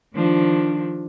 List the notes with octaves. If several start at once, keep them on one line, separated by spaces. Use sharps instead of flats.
D#3 F3 D4